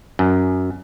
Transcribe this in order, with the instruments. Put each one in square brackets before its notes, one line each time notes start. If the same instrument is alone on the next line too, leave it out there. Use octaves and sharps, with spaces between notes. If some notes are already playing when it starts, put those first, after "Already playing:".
[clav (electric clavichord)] F#2